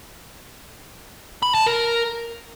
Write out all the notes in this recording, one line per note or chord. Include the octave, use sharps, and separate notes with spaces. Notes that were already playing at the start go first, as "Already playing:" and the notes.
B5
A5
A#4